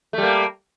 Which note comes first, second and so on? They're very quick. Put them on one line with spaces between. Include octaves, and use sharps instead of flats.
A3 G3 A#3